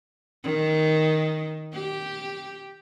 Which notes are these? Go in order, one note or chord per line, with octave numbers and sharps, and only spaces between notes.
D#3
G4